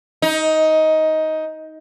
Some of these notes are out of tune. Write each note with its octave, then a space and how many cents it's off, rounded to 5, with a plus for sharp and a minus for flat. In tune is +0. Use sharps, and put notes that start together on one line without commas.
D#4 +15